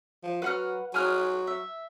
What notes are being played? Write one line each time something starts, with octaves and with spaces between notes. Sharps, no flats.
F3
F#3 B4 F#5 F6
F#3 G#5 D#6 F6
E5